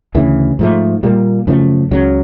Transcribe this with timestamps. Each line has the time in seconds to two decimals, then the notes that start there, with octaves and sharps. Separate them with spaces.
0.15 D2 C#3 E3
0.59 G#2 F3 A3
1.03 A#2 G3 A#3
1.47 F#2 C#3 F3 A3
1.91 C#2 C#3 F#3